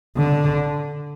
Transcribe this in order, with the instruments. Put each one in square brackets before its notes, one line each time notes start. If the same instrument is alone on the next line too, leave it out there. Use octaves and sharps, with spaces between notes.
[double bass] D3